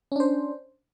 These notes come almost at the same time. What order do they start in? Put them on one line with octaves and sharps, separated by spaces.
C#4 D4 C5